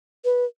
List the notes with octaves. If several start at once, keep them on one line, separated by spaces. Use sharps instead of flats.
B4